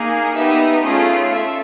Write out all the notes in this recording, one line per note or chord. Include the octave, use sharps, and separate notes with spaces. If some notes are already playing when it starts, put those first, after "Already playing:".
Already playing: A#3 D#4 G#4
B3 D#4 G4 E5
A3 C#4 F4 G#4 D#5
A4 E5